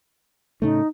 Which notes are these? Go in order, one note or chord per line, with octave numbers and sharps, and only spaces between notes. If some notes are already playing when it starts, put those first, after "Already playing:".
A2 C#3 A3 D#4